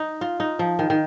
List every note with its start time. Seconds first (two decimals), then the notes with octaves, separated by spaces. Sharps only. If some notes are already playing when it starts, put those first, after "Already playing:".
Already playing: D#4
0.21 F4
0.40 D#4
0.59 F3
0.79 D#3
0.90 D#3